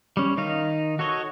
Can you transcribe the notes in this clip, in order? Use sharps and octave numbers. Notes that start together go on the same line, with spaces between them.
G3 C#4
D#3 D#4 F5
F#4 A4 C#5 D#5